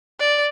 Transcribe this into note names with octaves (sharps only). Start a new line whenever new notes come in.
D5